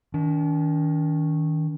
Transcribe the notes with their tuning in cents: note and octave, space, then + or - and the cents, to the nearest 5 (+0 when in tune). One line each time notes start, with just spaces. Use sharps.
D#3 +20 D4 -45